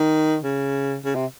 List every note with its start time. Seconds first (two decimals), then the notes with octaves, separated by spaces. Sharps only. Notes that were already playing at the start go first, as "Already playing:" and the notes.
Already playing: D#3
0.43 C#3
1.05 C#3
1.15 C3